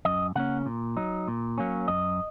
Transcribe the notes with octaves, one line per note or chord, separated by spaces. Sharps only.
F#2 D#5
C#3 A#3 C#4 F#5
A#2
F#3 D#4
A#2
F#3 A#3 C#4
F#2 D#5